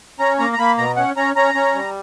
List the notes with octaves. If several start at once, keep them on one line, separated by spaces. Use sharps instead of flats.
C#4 A#5
A#3 A#5
A#5
A#3 B5
B2 A#5
C#4 F#5
C#4 A#5
C#4 A#5
C#4
G3